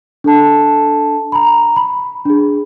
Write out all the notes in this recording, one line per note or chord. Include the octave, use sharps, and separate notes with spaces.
D4 A4 A5
A#5 B5
B5
D4 G#4